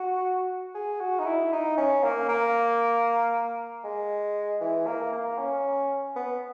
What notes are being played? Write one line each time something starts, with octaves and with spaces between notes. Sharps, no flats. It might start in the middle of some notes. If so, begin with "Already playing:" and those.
Already playing: F#4
G#4
F#4
D#4
E4
D#4
C#4
A#3
A#3
G#3
E3
A#3
A#3
C#4
B3